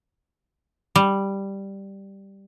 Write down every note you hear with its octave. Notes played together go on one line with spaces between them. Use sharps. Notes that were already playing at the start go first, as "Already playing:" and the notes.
G3